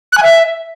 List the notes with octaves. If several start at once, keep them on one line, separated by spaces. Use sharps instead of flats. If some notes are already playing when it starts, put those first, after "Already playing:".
F#6
G#5
E5